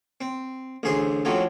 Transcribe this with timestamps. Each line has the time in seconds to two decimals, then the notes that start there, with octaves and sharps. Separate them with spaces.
0.21 C4
0.83 A1 D2 G#4 C5 C6
1.25 A1 F2 A2 F3 F#3 C4